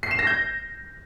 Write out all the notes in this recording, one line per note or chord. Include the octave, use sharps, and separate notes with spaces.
C7
E7
A#6
G6